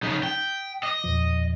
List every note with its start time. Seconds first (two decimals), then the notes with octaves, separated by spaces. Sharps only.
0.03 C#3 D#4 D#6 B6
0.23 G5
0.83 D#5 D6 D#6
1.04 E2 A#2 F3